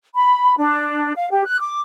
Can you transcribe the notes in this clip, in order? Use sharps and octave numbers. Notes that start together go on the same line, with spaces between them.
B5
D4
F5
G4
F#6
D6